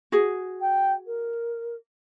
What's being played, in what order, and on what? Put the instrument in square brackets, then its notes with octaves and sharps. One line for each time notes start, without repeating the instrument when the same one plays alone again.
[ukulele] F#4 G#4
[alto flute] G5
A#4